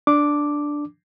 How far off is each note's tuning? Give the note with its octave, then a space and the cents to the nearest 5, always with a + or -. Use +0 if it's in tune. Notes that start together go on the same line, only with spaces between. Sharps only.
D4 +0 D6 +0